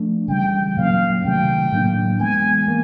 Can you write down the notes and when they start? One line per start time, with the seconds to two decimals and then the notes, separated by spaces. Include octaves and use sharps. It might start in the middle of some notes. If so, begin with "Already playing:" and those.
Already playing: F3 A3 D4
0.28 C#3 E3 G3 G5
0.77 A#2 F#3 A#3 C#4 F5
1.25 C3 D#3 F#3 A3 G5
1.72 A2 F#3 A#3 D4
2.20 E3 G#3 B3 G#5
2.68 A#3